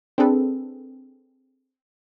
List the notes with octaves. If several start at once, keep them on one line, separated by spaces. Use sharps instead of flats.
C4 D4 G#4 A4 B4